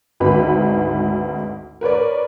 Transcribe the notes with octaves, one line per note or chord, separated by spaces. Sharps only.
G#1 D2 G#2 D#4 B4 B5
A#4 B4 C#5 D5